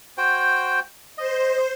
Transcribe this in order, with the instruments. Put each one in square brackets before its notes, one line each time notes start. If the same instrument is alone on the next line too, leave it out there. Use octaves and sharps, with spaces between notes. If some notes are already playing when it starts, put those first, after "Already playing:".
[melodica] F#4 C5 G5
[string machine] C5 [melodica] D#5